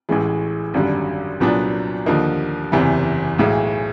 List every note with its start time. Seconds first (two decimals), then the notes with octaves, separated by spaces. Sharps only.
0.09 A1 A2 E3 G#3
0.74 G#1 F#2 D3 G3
1.40 C2 A#2 F#3 B3 D4
2.06 D#2 D3 F3 A#3 D#4
2.72 F#1 E2 C3 E3
3.38 B1 A2 E3 G#3